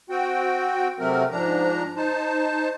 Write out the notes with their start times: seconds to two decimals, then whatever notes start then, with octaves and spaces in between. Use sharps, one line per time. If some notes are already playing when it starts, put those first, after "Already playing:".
0.10 C4 F#4 G5
0.99 C3 F#3 A3 C4 A#4
1.31 G#2 F3 D4 A#5
1.97 D#4 C5 A5